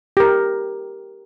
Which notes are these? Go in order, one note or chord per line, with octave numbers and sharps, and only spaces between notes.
G4 A#4